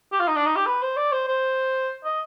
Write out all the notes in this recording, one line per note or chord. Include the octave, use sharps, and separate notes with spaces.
G4
F4
D#4
D4
D#4
G4
B4
C5
D5
C5
C5
D#5